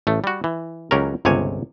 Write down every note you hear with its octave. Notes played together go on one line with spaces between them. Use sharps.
A1 A3
G3 F#4
E3
C#2 F#3 C#4 G4 A#4
G1 C#2 C3 C#5 G#5